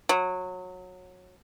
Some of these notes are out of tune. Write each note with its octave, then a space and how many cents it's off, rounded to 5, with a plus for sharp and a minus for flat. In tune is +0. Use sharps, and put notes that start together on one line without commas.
F#3 -20